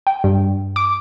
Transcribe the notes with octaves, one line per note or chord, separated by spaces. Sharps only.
G5
G2
D6